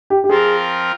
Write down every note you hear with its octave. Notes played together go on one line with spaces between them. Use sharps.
G4
G4
F3 C4 F4 G#4 A#4